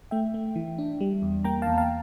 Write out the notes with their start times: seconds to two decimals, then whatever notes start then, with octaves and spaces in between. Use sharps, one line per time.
0.11 A3 E5 G5
0.34 A3
0.56 E3
0.78 D4
1.01 G3
1.22 E2
1.44 A#3 G5 A#5
1.62 E2 F5 A5
1.78 F5 A5